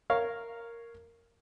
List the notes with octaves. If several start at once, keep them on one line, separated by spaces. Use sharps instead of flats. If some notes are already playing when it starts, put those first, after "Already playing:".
A#4 C#5 F5